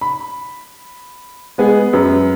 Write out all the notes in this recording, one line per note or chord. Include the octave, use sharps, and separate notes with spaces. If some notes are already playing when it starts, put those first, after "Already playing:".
B5
G#3 B3 G#4
F#2 B4